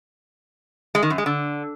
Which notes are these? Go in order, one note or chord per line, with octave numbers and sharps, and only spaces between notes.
G#3
D#3
F#2
G#3
D3